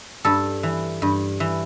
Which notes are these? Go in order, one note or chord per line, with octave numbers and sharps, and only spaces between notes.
G2 A4
E3
G2
E3